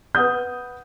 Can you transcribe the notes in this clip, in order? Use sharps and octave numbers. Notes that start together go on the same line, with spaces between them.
B4 F#5 D#6 G6